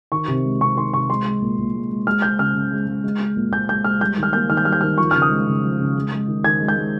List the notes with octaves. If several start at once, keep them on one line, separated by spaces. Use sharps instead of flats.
D#3 C#6
C3
G#3
C3 C#6
D#3 C6
C3 C#6
G#3 C6
G#3
A#2
A#2
G#3
G#3
G#3 F6
G#3 G6
C#3 F6
C#3
G#3
G#3
G#3
G#3
A#2
A#2 G6
G#3 G6
G#3 F6
G3 G6
D#3
F6
A#3 G6
D#3 F6
G6
G3 F6
G6
D#3 F6
F3 C#6
C#3 F6
D#6
G#3
C#3
F3
C#3
G#3
G#3
D#3
D#3 G#6
G#3
G6
G#3